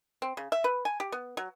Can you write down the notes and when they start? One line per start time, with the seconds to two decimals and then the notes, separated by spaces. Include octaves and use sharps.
0.22 C4
0.37 C#3
0.52 E5
0.64 B4
0.85 G#5
1.00 G4
1.12 B3
1.37 F#3